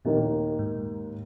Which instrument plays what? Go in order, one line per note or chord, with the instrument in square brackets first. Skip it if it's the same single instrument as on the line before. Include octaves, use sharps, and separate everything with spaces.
[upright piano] D#2 D#3 A#3 D#4 [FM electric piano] A#2
[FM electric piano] G#2